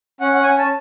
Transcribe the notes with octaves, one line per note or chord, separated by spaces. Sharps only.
C#4 F#5
F#5
C#4 G#5
A5